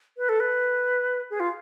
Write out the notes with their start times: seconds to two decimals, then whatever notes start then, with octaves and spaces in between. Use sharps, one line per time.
0.17 B4
0.29 A4
0.40 B4
1.30 G#4
1.40 F4